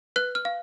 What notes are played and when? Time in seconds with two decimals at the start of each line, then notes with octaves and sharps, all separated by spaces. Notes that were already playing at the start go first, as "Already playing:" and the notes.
0.16 B4 F#6
0.35 F6
0.45 F5